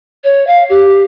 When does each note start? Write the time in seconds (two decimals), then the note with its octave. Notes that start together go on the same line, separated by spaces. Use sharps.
0.24 C#5
0.47 F5
0.70 G4